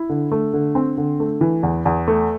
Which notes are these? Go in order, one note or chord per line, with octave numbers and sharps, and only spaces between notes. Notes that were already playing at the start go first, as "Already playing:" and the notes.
Already playing: E4
D3
A3
D3
C4
D3
A3
E3
E2
E2
A3